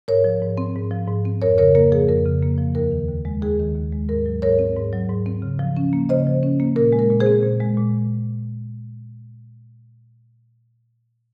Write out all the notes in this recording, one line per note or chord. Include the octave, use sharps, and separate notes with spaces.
G#2 A#4 C#5
F3
G#2
C4
G#2
F3
G#2
C4
F2 A#4 C#5
C#3 A#4 C#5
A#3 A#4
F3 G#4
F2 A#4
C#3
A#3
F3
D#2 A#4
D#3
D#2
G#3
D#2 G#4
D#3
D#2
G#3
G#2 A#4
F#3
G#2 A#4 C#5
C4
G#2
F#3
G#2
C4
C#3
F3
C#4
A#3
C#3 C5 D#5
F3
C#4
A#3
A#2 A#4
G#3
A#4
A#2
G#4 C5
C4
A#2
G#3
A#2